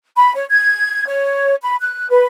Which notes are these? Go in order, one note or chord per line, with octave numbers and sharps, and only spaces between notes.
B5
C#5
G#6
C#5
B5
F#6
B4